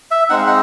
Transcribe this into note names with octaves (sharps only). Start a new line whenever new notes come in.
E5
G#3 C4 D#4 F#5
F5
F#5